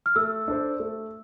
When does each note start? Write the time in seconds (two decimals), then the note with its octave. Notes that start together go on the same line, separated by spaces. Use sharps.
0.06 F6
0.16 A3 E6
0.48 D4 A4 C5
0.80 A3